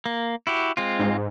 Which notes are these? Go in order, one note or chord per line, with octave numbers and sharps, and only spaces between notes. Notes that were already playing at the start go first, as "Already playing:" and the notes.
A#3
E4 F#4 G4
G#3 C4 F4
G#2